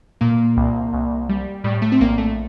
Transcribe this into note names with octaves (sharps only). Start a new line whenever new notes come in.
A#2 A#3
C2
C2
G3
A2 G3
A3
C4
A#1 A#3
A3